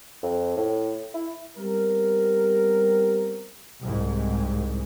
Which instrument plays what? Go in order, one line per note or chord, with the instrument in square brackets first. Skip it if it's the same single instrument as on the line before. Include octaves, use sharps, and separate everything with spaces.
[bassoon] F2
A2
E4
[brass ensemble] G3 B3 C4 G4 A#4
[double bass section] C2 G#2